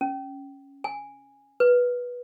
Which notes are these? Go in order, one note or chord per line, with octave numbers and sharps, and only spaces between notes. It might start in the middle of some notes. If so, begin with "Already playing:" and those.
C#4
G#5
B4